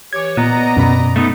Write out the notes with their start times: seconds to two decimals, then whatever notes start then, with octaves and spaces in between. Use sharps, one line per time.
0.13 E3 G4 C#5 D6 G#6
0.37 A#2 B3 D5 D#5 A#5
0.77 F#2 B2 B5
1.16 A3 B3 D#4